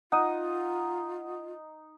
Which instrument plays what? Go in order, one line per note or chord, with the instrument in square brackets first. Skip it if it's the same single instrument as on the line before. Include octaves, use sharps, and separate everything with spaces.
[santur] D#4 [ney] F4 [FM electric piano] F#5 D#6